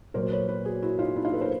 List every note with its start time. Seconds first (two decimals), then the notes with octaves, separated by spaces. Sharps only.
0.14 A#2 F#3 A#4 C5
0.32 B4 C#5
0.48 B4 C#5
0.65 F#4 G#4
0.82 E4 F#4
0.99 D#4 F4
1.16 D4 E4
1.24 D#4 F4
1.33 A4 B4
1.41 A#4 C5